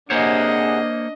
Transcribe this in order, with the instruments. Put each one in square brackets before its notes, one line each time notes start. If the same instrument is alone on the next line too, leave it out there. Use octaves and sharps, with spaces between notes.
[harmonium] C3 G#4 F#5 [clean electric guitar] A#3 C5 C#5 [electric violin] D4 D#5